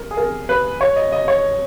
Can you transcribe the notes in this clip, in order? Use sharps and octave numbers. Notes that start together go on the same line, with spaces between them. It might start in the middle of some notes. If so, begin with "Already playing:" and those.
Already playing: A#4
G#4
A#4
B4
C#5
D#5
D#5
C#5